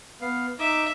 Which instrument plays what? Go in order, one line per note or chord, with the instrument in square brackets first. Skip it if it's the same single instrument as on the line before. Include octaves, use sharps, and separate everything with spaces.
[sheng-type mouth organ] B3 F5
[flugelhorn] D#4 [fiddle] E5 [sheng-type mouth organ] D6